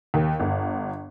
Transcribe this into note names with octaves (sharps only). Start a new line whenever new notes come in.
D#2
G1